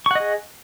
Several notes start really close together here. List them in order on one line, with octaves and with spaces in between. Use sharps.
C#6 F#5 D#5 G#4